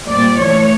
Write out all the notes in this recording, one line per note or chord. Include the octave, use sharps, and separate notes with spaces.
A#2 G3 C4 D5
E3 A3 D4 C#5